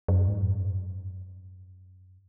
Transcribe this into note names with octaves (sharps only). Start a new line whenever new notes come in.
F#2
G#2
F2
F#2